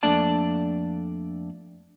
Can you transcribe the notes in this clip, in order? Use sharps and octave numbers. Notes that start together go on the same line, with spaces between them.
F2 A3 A#3 D4 D5 A5